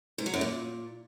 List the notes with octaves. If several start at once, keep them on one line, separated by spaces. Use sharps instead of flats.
G#2
F#3
F#2
A#2